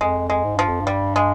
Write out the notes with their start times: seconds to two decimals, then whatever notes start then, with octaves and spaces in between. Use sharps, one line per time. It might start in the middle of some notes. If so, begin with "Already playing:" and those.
0.01 F2 G#3
0.30 G#3
0.44 G#2
0.56 G2 F3
0.68 F2
0.81 G2
0.87 G3
1.16 G#3